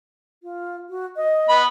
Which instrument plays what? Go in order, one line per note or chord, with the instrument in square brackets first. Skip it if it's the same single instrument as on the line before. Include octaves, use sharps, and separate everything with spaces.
[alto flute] F4
F#4
D#5
[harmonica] B3 B5